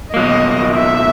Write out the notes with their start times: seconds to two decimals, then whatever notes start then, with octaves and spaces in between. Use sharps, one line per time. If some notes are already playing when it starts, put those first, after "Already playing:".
0.14 B2 F#3 A#3 D#5
0.75 E5